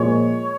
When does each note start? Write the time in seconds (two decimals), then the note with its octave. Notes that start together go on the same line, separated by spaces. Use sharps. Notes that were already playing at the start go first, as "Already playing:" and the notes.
Already playing: A#2 F3 G#3 C#5